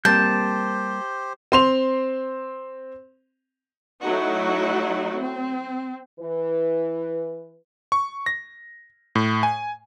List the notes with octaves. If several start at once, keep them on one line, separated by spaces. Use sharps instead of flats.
G3 A#3 C4 G4 C5 A5 G6
C4 C6 F7
F#3 A3 D#4 E4 F#4
C4
E3 B4
C#6
A#6
A2
G#5